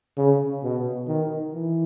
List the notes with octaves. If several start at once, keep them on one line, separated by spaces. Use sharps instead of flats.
C#3
B2
D#3
E3